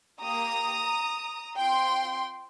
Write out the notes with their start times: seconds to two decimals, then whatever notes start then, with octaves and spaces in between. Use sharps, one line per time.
0.21 A#3 G4 A#5 D#6
1.57 C4 F4 G5 C6